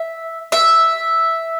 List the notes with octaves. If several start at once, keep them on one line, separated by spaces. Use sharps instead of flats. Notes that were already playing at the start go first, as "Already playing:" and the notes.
Already playing: E5
E5